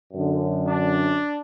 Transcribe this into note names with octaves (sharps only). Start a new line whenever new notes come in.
F#2 D3
D4